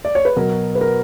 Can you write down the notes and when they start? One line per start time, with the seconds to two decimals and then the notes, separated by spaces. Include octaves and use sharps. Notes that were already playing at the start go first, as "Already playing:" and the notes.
0.05 D5
0.15 C#5
0.25 B4
0.36 B2 F#3 A#4
0.75 B4
0.81 A#4